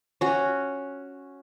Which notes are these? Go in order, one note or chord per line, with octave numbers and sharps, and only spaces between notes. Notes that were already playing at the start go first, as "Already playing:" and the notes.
C#4 F#4